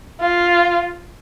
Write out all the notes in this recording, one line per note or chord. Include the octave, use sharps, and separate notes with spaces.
F4